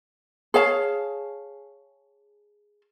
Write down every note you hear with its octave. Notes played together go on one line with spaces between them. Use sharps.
G#4 C#5 F5 A5